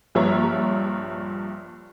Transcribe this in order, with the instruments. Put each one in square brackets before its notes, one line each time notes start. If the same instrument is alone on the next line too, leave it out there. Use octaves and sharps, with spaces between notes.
[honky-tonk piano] A#1 G2 F3 C#5 E5 A#5